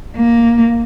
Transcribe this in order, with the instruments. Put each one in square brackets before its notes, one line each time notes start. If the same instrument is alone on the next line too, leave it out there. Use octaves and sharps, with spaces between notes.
[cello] A#3